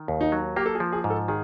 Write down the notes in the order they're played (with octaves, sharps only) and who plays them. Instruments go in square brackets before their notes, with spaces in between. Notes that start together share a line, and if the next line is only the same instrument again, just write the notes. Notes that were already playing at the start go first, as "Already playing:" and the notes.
Already playing: [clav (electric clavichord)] D#3
D#2
[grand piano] D#4
[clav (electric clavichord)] F#3
[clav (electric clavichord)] A#3 [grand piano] G4
[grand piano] A4
G#4
[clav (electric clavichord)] F3
[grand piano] G#4
[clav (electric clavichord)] G#2
[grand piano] A4
[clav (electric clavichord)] D#3 [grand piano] G#4